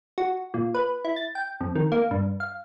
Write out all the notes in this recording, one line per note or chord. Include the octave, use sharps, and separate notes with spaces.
F#4
A#2
B4
E4
A6
G5
F2
D#3
A#3
G2
F5